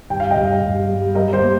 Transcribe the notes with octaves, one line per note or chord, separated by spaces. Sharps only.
G2 G5
F5
D#5 G5
G2
G2
G3
G3 A#4 D#5
G4 C5
A#3